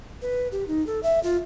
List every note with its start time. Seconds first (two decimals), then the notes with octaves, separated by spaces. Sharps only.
0.22 B4
0.52 G4
0.68 D#4
0.87 A4
1.03 E5
1.23 F4